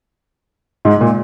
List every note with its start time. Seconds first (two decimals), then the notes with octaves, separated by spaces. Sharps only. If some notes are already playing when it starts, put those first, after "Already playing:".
0.85 G#2
1.01 A#2